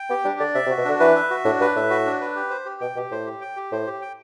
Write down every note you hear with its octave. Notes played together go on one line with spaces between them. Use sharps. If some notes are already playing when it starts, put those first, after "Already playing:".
Already playing: G5
B3 G4
G3 D4
D3 D5
C3 E5
C3
F#4
B2
D3 D4
E3 B4
E5
F#4
A2 D4
G2 B4
A2 E5
F#4
D4
B4
G4
C5
G4
B2 G5
B2 G4
A2 C5
G4
G5
G4
A2 C5
G4
G5